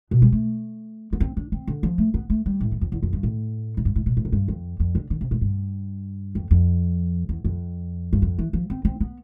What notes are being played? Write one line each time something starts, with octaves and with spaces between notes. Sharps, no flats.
B2
G3
A3
B3
C4
D4
C4
D3
F3
A3
B3
A3
G3
A2
G2
F2
E2
F2
G2
A2
A2
G2
A2
B2
A2
F2
G2
F2
F2
D3
D3
C3
A2
G2
F2
F2
E2
F2
G2
F2
E3
F3
C4
C4
B3